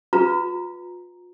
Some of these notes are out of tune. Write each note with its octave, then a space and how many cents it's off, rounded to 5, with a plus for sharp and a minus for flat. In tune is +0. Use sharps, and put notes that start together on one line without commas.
F4 +35 B4 +0 A#5 +0